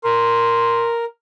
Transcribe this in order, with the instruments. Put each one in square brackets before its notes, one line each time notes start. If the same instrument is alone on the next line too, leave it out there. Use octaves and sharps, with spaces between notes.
[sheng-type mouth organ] A#4 [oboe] C6